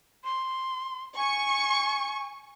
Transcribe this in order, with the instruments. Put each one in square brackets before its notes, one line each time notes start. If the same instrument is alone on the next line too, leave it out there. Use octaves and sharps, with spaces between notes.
[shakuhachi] C6
[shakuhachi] G#5 [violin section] C#6